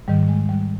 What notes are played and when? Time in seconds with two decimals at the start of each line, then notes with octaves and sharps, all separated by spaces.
0.08 G#2 D#3 G3
0.29 G#3
0.49 G3